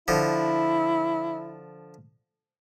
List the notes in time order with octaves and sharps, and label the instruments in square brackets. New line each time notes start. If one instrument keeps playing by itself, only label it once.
[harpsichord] D3 F3 [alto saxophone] E4